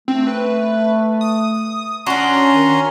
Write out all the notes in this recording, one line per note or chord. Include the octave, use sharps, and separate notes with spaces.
A3 C4
B4
D#6
C#4 D4 F#4 A#5 C6
D#3